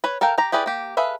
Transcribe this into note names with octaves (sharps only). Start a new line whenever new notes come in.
B4 C#5
A4 A#4 F5 G5
G4 A#5
E4 G4 G#4 B4 D5
A#3 G4
G#4 A4 B4 E5 F5